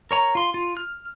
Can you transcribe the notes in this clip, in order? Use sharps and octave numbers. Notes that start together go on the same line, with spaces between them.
A#4 C#5 A#5
F4 C6
F4
F6